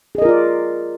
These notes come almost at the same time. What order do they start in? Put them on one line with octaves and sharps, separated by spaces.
G#4 D#5 A#4 F4 D5